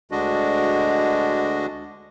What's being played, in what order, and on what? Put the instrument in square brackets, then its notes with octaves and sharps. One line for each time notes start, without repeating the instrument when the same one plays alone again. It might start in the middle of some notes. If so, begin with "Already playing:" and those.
[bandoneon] D2 D3 G#3 D4 F#4 D#5